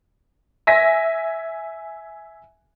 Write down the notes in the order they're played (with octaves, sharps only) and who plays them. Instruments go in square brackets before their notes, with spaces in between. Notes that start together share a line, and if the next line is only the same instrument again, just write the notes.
[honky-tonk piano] E5 G#5 A#6 B6